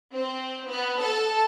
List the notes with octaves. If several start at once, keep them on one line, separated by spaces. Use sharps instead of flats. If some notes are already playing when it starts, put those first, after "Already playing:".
C4
B3
A4